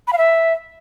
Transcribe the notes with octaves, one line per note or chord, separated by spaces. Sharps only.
B5
F5
E5